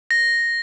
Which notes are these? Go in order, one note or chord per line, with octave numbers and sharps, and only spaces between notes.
A#6